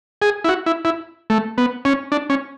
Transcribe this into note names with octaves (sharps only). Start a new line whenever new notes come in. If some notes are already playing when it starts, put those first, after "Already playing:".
G#4
E4
F#4
E4
E4
A3
B3
C#4
D4
C#4